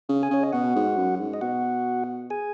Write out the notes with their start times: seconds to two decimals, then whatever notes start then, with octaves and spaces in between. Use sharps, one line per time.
0.09 C#3
0.23 G#4 G#5
0.30 C#3 C#5
0.43 D#5
0.53 B2 F#4 F#5
0.75 G#2
0.97 F#2
1.20 G#2
1.34 D#5
1.41 B2 F#4 F#5
2.30 G#4 G#5